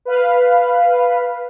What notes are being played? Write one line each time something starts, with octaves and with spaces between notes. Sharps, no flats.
B4 F5